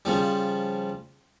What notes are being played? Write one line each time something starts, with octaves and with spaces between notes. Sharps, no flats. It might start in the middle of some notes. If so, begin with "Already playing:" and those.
C#3 F3 G3